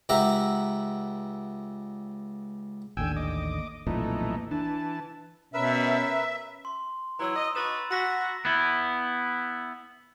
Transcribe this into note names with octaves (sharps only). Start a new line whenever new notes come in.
C#2 G4 E5 F#5 A#5
A1 D#2 D3 G5 G#5 E6
D#5 D6
B1 F2 A#2 E3 A3 D#4
E3 D4 A5
B2 C#4 A#4 B4 E5 E6
C6
E3 F#3 E4 A#5 E6
D#5
D#4 F#4 B4 B5 A6 E7
F#4 E6 A#6 B6
B3 E4